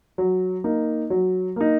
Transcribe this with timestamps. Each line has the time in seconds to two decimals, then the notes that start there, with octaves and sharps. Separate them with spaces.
0.18 F#3
0.64 A#3 D#4
1.10 F#3
1.56 A#3 D#4